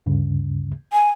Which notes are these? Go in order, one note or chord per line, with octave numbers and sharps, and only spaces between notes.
D2 G2 C#3
G#5